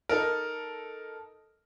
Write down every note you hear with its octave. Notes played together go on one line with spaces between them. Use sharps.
D#4 A4 A#4